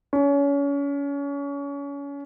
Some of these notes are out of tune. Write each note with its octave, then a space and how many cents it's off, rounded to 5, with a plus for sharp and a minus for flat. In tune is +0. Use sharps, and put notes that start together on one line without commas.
C#4 +30